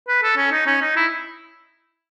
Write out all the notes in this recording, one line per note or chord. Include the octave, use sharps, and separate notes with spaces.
B4
A4
C#4
D#4
C#4
D#4
E4